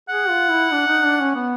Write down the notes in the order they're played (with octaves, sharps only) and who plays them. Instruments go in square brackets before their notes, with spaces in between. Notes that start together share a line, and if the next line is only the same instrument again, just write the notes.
[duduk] G#4 [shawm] F#5
[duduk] F4
E4
D4
D#4
D4
C#4
B3